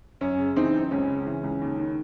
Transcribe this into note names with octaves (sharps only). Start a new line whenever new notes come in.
F#2 C#4
C#3
E3 C4 D#4
F#2
C#2 C#4
C#3
E3
C#2
D#2
D#3